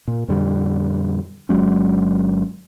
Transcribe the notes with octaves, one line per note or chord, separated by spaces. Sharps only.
A#2
F2 A#2 D3 G3
G1 F#3 G#3 C#4